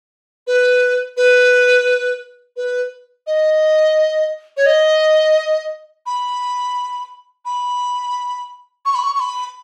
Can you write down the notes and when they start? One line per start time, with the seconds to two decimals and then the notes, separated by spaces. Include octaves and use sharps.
0.47 B4
1.17 B4
2.57 B4
3.27 D#5
4.57 C#5
4.66 D#5
6.06 B5
7.45 B5
8.86 C#6
8.95 B5
9.03 C#6
9.15 C#6
9.20 B5